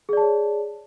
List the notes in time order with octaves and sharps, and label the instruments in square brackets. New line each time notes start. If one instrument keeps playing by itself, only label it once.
[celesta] G#4
D5
A5
C#5